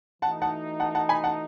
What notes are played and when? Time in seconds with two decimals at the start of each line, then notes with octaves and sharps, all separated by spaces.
0.22 E3 A3 D#4 F#4 F#5 A5
0.42 F#5 A5
0.80 F#5 A5
0.95 F#5 A5
1.09 G#5 B5
1.24 F#5 A5